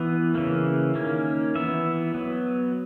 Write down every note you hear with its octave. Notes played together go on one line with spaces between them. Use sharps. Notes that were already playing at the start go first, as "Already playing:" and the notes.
Already playing: E3 B3
C#3 E3 A#3
D#3 A#3 C#4
E3 B3 E5
F#3 B3